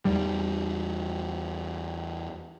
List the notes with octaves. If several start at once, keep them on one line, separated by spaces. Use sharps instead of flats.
E2 G3